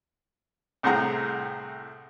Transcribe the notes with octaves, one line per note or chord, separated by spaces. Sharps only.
C2 A2 C4 G#4 F#5 A#5